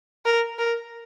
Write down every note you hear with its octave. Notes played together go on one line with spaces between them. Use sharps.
A#4
A#4